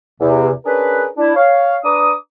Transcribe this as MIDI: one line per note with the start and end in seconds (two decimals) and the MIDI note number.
0.21 0.50 40
0.21 0.50 48
0.65 1.06 61
0.65 1.06 62
0.65 1.06 68
0.65 1.06 70
0.65 1.06 71
1.17 1.34 62
1.17 1.34 64
1.36 1.76 73
1.36 1.76 77
1.84 2.13 62
1.84 2.13 71
1.84 2.13 82
1.84 2.13 86
1.84 2.13 87